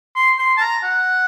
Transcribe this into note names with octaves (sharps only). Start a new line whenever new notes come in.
C6
C6
A5
A#5
F#5